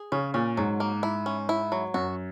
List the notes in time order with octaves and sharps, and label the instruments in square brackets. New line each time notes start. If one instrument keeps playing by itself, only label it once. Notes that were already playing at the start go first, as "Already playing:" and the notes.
Already playing: [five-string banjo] G#4
[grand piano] C#3 [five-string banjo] C#4
[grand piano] A#2 [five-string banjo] C#4
[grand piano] G#2 [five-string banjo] F#3
[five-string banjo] A#3
E4
C#4
E4
F#3
[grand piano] F#2 [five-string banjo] F#4